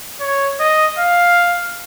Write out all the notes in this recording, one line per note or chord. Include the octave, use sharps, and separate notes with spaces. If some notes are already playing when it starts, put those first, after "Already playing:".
C#5
D#5
F5